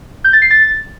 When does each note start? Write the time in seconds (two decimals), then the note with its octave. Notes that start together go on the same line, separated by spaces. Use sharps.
0.24 G6
0.33 A6
0.42 C7
0.50 A6